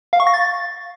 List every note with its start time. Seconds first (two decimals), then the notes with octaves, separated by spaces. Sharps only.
0.13 F5
0.20 C#6
0.27 A#6
0.34 A6